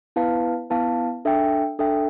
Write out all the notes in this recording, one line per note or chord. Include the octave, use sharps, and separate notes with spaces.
B3 E4 B4 F5 A5
B3 E4 B4 F5 A5
D4 A4 E5 G5
D4 A4 E5 G5